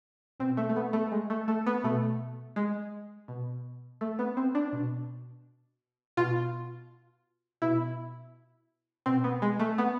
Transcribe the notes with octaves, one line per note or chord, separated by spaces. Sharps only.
B2 C4
A3
A3
B3
A3
G#3
A3
A3
B3
B2 A3
G#3
B2
A3
B3
C4
D4
B2
B2 F4
B2 E4
B2 C4
B3
G#3
A3
B3